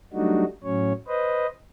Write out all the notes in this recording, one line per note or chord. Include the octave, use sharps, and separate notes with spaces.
F#3 G3 A3 D4 D#4 F#4
A2 F#3 C#4 C#5
B4 C5 D#5